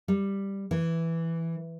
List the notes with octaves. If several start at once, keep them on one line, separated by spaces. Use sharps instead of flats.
G3
E3